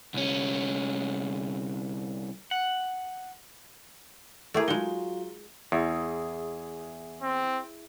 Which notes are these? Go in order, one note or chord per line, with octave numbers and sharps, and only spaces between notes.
C2 C#4
F#5
A3 E4 G4 G#4 A#4
F#3 G#3 D#4 F4 G7
E2 E4 G#4
C4